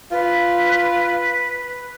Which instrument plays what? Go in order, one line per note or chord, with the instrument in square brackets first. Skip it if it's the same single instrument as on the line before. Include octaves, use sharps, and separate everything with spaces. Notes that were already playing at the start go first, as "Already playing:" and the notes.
[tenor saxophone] F4 [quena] B4